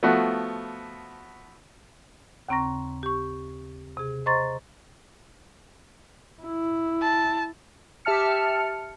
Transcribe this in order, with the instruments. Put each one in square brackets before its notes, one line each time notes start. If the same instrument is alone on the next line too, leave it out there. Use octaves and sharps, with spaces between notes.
[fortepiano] F3 A3 B3 F#4
[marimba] D#2 C#3 C4 A#5 C#6 A#6
G4 C#6
C3 G#4
C5 D#5 A#5 C6 C#6 A6
[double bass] E4
[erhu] A5
[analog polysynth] G4 E5 A5 F6 C#7